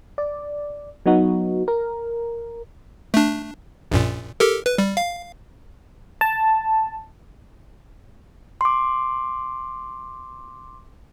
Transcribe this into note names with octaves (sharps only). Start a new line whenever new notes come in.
D5
F#3 B3 D#4 F#4
A#4
A3 D4
A#1 F#2 A#2
G4 A4 A#4
B4
G3
F5
A5
C6 D6